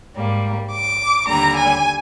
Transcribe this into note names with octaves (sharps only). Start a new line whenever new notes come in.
G#2 G3 A#3
D6
D#2 D3 G3 A#5
G#5